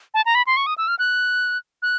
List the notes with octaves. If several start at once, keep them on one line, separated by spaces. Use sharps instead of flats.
A5
A#5
B5
C6
C#6
D#6
E6
F6
F#6
F#6